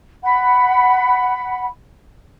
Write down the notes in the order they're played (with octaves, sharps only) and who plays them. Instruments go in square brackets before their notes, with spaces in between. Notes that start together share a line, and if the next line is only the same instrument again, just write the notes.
[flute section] F#5 B5